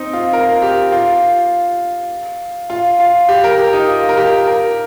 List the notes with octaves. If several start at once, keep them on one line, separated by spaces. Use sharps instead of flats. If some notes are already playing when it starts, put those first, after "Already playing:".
Already playing: C4 D#4
F4
A#4
G4
F4
F4
F4
G4
A#4
G4
D#4
F4
A#4
G4
A#4